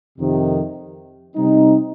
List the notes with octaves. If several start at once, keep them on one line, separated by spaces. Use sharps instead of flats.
F2 C3 D#3
C3 G3 C4 D#4